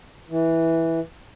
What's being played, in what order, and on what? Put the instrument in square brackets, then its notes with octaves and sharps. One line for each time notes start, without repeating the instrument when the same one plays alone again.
[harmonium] E3